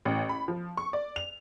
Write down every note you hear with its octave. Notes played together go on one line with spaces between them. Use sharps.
A1
B5
F3
C#6
D5
F7